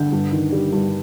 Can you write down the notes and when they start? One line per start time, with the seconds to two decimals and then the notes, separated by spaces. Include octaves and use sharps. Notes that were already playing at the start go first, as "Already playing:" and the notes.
Already playing: D3 G6
0.12 G2
0.32 D#3
0.52 G3
0.72 G2